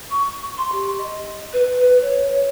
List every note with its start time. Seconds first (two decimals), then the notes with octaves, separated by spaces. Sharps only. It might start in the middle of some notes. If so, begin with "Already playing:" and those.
0.10 C#6
0.57 C6
0.72 G4
0.98 D#5
1.53 B4
2.02 C#5